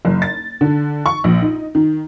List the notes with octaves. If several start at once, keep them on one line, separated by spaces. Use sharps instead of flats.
F#1
A6
D3
C#6
A#1
D#4
D#3